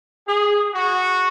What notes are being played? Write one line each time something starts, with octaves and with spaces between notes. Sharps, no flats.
G#4
F#4